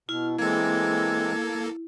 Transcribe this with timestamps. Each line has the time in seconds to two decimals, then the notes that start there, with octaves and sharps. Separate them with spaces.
0.09 B2 E4 F6
0.39 E3 G#3 A#3 C4 A4 G#6